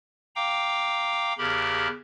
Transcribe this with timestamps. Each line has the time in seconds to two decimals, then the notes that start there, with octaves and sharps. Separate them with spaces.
0.36 F5 G5 A#5 D6
1.38 E2 C#3 G4 A#4 B5